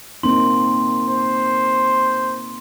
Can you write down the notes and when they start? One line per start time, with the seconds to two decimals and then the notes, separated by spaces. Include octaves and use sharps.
0.23 A#3 C4 D#4 C6
1.07 C5